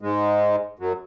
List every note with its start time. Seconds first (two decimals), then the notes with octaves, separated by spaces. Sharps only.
0.02 G#2 G#3
0.79 F#2 F#3